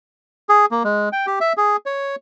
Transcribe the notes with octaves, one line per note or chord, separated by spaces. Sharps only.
G#4
A#3
G#3
G5
G4
E5
G#4
C#5